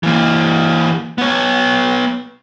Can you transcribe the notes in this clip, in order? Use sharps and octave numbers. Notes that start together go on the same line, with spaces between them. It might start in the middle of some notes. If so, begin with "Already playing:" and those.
E3 A#3
B3 C#5